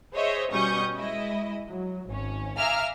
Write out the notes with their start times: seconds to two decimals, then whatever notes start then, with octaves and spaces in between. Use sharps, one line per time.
0.14 G#4 C5 C#5 D#5 E5
0.51 B2 G3 C#4 C#6 D#6 G6
0.96 G#3 E4 D#5
1.69 F#3
2.09 G#1 C#4
2.57 E5 F5 G#5 A#5 D6 F6